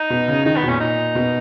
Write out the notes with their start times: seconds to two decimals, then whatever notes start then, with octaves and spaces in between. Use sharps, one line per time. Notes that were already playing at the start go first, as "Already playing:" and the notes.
Already playing: D#4
0.10 B2
0.28 C#3
0.45 D#3 D#4
0.57 B3
0.63 B2
0.68 A#2 C#4
0.80 D#4
1.15 B2